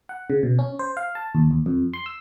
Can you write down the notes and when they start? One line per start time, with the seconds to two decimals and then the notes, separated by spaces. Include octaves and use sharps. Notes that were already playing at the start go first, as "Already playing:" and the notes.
0.09 F#5
0.30 C#3
0.43 B2
0.59 C#4
0.79 C5
0.97 F5
1.15 A5
1.35 D#2
1.51 D#2
1.66 F2
1.93 C6
2.06 E6